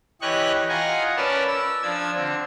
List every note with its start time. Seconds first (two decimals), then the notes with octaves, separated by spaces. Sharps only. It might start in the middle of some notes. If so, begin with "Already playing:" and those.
0.21 E3 G4 C#5 D#5 C#6 F#6
0.69 F4 D#5 F#5 G#5 A#5
1.17 C#4 A#4 B4 D5 A5
1.48 E6
1.83 F3 D4 G#6
2.15 D3 C4